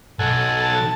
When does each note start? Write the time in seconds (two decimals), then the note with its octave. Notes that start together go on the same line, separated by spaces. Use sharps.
0.19 B1 A4 F#5 G#5
0.60 A5